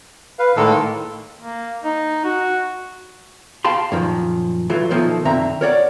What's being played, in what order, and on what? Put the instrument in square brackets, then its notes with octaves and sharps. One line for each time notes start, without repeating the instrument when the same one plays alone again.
[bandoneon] B4 F5
[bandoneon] A2 D#3 [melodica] G#3 A#3 A4
[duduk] A#3
D#4
F#4
[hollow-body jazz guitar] F5 G5 A5 C6
F#2 A#2 D#3 F3
E3 F#3 A3 F4
B1 B2 D#3 F3 A3 A#3
F#2 D3 D#3 C4 E5 A#5
A#4 C#5 D5 F#5